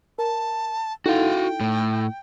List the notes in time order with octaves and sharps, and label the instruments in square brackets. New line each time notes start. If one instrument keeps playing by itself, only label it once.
[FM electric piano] A#4 [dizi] A5
[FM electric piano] D#4 E4 A4 [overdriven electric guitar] F#4 F5 [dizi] G5
[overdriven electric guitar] A2